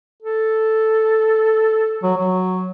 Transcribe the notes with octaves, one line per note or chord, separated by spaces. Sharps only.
A4
F#3
F#3